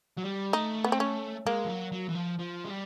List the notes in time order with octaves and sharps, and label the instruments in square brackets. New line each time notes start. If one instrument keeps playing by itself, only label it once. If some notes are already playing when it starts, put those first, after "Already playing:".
[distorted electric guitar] F#3
G3
[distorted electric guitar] A3 [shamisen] D#4
[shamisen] B3
C4
C#4
[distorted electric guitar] G#3 [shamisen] A#3
[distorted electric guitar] F3
F#3
F#3
E3
F3
F3
G#3
G3